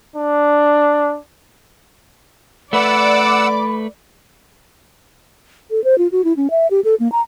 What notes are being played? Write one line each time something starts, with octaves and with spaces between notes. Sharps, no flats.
D4
A3 B4 D5 F#5 B5 D6 E6
A4
C5
F4
F#4
E4
C#4
E5
G4
A4
A#3
A#5